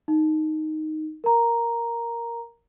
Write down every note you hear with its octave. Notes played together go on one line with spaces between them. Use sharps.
D#4
A#4 A#5